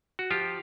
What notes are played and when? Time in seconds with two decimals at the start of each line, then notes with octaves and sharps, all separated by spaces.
0.19 F#4
0.31 F3 F4 G4